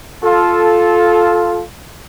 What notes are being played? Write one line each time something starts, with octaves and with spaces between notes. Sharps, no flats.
F4 A4